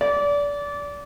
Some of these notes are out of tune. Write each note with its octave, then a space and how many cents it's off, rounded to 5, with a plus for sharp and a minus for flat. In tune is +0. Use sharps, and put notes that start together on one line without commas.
D5 -25